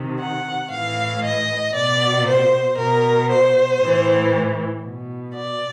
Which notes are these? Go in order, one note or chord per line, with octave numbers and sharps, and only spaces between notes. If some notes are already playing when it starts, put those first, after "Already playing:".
Already playing: C3 D#3
F#5
A2 E3 F5
D#5
B2 D5
C5
B2 A#4
C5
A2 E3
B2
D5